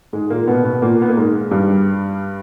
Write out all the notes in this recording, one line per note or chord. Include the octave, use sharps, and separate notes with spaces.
G#2 G#3
A#2 A#3
B2 B3
B2 B3
A#2 A#3
B3
A#3
G#2 G#3
G2 G3